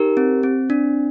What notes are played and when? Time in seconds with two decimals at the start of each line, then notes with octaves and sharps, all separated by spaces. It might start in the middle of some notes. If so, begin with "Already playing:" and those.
Already playing: D#4 G4 A#4
0.17 C4
0.43 C4
0.70 D4